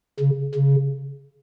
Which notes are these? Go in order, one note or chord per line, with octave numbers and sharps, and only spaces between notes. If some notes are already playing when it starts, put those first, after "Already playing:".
C#3
C#3